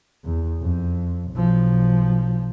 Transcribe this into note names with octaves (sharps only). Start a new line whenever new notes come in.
E2
F2
B1 F3